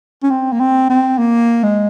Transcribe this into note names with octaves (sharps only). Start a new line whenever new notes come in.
C#4
C4
A#3
C4
C4
A#3
G#3